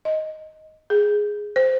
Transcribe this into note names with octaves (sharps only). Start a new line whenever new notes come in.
D#5
G#4
C5